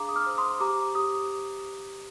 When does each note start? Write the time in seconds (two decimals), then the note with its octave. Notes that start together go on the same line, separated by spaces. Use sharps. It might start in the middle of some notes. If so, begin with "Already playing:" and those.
Already playing: D4 G#4 F5 A#5 D6
0.09 D#6
0.15 D6 F6
0.26 C5
0.38 C6 D#6
0.50 C6
0.60 G4 A#5 D6
0.95 G4 D#6